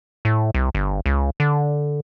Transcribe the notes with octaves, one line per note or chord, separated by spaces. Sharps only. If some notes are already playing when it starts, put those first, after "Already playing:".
A2
C2
G1
C#2
D3